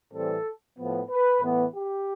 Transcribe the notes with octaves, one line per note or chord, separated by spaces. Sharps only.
A2 E3 G3 C4 A4
A2 F3 B3
B4
A2 E3 B3
G4